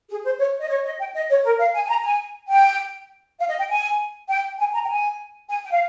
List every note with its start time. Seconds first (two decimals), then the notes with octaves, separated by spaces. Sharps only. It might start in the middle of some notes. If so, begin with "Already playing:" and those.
0.09 G#4
0.24 C5
0.39 C#5
0.60 D#5
0.69 C#5
0.85 D#5
0.99 G5
1.14 D#5
1.30 C#5
1.44 A#4
1.59 F5
1.74 G#5
1.85 G#5
1.89 A#5
2.04 G#5
2.49 G5
3.39 F5
3.49 D#5
3.59 G5
3.69 G#5
4.29 G5
4.59 G#5
4.73 A#5
4.84 G5
4.88 G#5
5.49 G#5
5.64 G5
5.71 F5